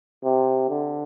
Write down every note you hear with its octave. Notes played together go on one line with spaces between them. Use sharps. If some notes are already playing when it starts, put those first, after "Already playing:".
C3
D3